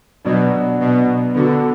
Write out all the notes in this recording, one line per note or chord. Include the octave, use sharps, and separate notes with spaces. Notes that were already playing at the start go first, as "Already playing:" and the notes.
B2 F#3 B3 D4
B2
D3 B3 F#4 A4